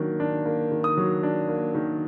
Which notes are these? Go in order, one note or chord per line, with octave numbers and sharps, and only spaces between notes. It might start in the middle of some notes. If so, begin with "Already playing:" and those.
Already playing: D#3 F#3 A#3 D4
D4
A#3
D#3
D#6
F#3
D4
A#3
D#3